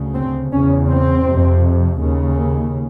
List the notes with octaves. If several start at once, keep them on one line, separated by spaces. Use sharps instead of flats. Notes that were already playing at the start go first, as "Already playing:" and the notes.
Already playing: D2 C#3
C4
E2 C#3 C#4
C4
F2 C3
D#2 C#3